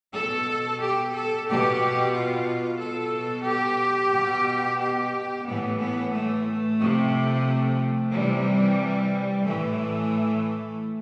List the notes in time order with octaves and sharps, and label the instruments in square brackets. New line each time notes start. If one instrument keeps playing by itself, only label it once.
[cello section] B2 A4
G4
A4
B2 G4
F4
B2 A4
G4
B2
G4
A2 E3 B3
B3
A3
C3 F3
C3 E3 G3
A2 E3 A3